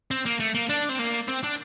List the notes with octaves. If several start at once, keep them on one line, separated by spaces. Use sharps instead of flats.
C4
A#3
A3
A#3
D4
C4
A#3
C4
D4